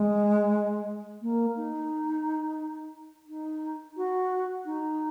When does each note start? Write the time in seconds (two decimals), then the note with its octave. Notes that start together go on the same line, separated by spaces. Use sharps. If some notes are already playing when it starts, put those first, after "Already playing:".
Already playing: G#3
1.22 A#3
1.56 D#4
3.28 D#4
3.97 F#4
4.65 D#4